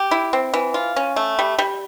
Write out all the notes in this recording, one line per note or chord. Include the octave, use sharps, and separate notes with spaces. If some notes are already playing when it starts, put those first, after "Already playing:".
Already playing: G4
E4
C4
E3
F4
C#4
A3
G3
G3